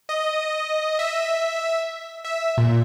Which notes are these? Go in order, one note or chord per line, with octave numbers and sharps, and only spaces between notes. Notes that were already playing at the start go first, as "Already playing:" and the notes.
D#5
E5
E5
A#2